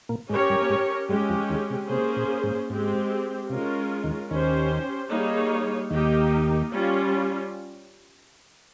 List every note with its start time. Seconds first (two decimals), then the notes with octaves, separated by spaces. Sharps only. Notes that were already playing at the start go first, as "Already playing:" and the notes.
0.09 A#2 A#3
0.29 G#2 G#3 C#4 G4 A#4 C#5
0.50 G2 G3
0.62 A#3
0.69 G#2 G#3
1.09 G2 G3 G#3 C#4 G4
1.29 F2 F3
1.50 D#2 D#3
1.70 C3
1.90 C3 A#3 C#4 G#4 C5
2.16 A#2
2.44 G#2
2.70 G#2 G#3 C4 G4
3.50 C3 G#3 C#4 F4 A#4
4.04 D#2 D#3
4.30 D#2 D#3 C#4 G4 C5
5.10 G3 A#3 D#4 G#4 C#5
5.90 D#2 D#3 A#3 D#4 G4
6.71 G3 C#4 F4